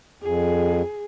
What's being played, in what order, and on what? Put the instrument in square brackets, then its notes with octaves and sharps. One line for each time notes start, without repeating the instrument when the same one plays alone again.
[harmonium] F2 [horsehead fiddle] G#4